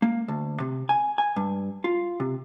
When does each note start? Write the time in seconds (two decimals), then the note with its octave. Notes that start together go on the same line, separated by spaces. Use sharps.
0.02 A#3
0.28 D2
0.60 C3
0.89 G#5
1.18 G#5
1.36 G2
1.84 F4
2.20 C3